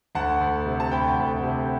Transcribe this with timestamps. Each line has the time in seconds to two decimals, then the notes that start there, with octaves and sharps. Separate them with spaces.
0.15 D2 F#5 A5
0.41 D2
0.66 C3
0.80 A5
0.91 D2 G5 B5
1.18 D2
1.43 C3